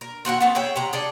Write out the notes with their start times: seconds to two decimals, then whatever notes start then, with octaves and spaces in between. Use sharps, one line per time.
0.01 A#4
0.25 C4 F#4 A#4 F#5
0.41 A3 B3 C4
0.55 G#4 C#5 E5 G5
0.76 C3 F#5 A#5
0.93 G#4 A4 D5